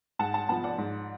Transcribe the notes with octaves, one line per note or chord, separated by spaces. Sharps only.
G#2 F#5 A5
F#5 A5
F3 B3 F#5 A5
D5 F#5
G#2